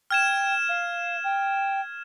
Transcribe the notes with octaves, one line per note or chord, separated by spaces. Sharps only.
G5 F6 G#6 E7
F5
G5